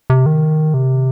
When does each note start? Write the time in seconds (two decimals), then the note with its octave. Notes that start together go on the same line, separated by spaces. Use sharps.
0.10 C3
0.26 D#3
0.74 C3